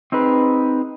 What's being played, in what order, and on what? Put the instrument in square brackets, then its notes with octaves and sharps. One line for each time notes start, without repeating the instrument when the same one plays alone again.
[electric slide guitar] C4 D#4 G#4 B4